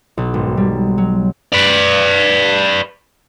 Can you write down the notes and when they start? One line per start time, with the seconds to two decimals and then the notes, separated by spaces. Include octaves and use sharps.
0.17 B1
0.34 G#1
0.57 G3
0.98 F#3
1.53 B4 D5